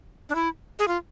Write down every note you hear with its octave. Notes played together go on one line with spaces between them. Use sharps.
D4
E4
G#4
F4